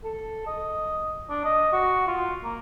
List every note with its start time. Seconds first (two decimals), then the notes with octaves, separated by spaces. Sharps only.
0.04 A4
0.46 D#5
1.29 D4
1.44 D#5
1.72 F#4
2.07 F4
2.44 A#3